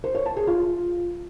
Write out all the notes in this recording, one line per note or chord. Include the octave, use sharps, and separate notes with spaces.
C5
C#5
A5
G#4
F4